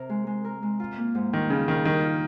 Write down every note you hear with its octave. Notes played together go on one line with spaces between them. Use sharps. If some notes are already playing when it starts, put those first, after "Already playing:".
Already playing: C3 A#4
G#3
G#3
A#4
G#3
F4
A#3
G#2
D#3 G3
C#3 G3
D#3 F4
D#3 G3
F4